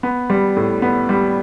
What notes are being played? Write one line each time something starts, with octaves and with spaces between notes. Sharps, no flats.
B3
G3
A2
B3
G3